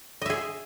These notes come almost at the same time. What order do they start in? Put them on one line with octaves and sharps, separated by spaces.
D#5 E5 G#4